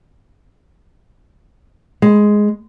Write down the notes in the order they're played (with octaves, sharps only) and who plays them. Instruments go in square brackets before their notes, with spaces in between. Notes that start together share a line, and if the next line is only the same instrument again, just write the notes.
[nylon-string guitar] G#3